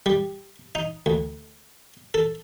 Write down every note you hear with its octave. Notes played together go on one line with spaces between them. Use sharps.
G3
D#4
D2
A4